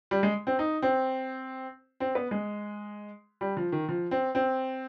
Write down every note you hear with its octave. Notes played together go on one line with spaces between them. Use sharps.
G3
G#3
C4
D#4
C4
C4
B3
G#3
G3
F3
D#3
F3
C4
C4